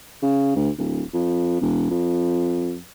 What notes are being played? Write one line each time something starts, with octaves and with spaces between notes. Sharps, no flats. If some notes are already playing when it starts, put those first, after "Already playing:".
C#3
D2
D1
F2
E1
F2